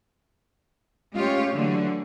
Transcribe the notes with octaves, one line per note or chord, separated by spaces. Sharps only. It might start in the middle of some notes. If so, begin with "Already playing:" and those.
G#3 A3 C#4 F4 G4 C#5
D3 E3 F#3 A3